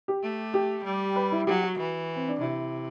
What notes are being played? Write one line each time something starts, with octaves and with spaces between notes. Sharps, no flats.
G4
A3
G4
G3
B4
E4
F#3 G4
F#4
E3
C4
D4
C3 E4